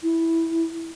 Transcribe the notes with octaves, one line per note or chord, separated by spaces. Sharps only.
E4